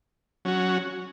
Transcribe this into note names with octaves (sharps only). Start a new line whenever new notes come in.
F#3 C#4 F#4